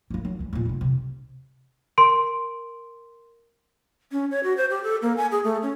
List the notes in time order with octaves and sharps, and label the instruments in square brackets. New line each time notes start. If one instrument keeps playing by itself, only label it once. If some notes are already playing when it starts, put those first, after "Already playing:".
[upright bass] F#3 A#3
F#3
E3 G3
D#2 A#2
F2 B2
C3
[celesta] A#4 C6 D7
[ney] C#4
C#5
F#4
C5
G4
A4
A#3
G#5
G#4
A3
C#4